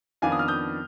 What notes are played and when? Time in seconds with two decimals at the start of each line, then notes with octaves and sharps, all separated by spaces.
0.22 F2 D#3 B3 D4 F5 G#5
0.32 D#6
0.39 F6
0.48 D#6 G6